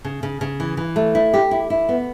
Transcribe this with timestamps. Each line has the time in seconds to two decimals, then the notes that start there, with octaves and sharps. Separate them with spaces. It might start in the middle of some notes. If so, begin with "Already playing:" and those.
0.04 C#3
0.23 C#3
0.41 C#3
0.60 E3
0.77 E3
0.96 A3
1.15 E4
1.34 G4
1.51 E4
1.70 E4
1.89 B3